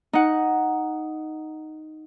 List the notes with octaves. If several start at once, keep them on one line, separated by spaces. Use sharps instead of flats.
D#4 F#5